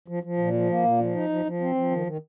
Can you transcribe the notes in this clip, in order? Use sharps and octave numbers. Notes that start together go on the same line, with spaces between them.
F3
F3
A#2
F3
A#3
A#2
F3
D#4
F3
F3
C4
F3
D#3
D#3